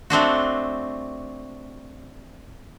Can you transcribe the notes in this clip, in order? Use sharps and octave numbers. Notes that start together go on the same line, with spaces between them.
A3 C4 D4 F#4